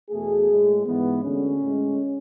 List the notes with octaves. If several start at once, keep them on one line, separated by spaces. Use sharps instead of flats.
E2 B2 A3 G#4
A2 G#3
G#2 E3 G#3 B3
D2 D3 G#3 C#4
A2 G#3